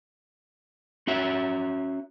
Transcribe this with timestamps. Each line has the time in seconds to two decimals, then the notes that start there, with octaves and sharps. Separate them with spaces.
1.07 C#4 F#4 E5